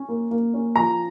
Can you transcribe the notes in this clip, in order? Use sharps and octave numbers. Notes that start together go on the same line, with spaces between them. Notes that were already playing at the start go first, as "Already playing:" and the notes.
Already playing: C#4
A#3
A#3
C#4
F3 A#5